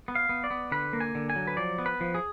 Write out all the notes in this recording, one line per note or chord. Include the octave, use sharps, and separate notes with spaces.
B3
F5
B3
D5
B3
D3 B4
A#3
G#5
D3
G#5
F#3
B4
F3 D5
B3
B4
F3
G#4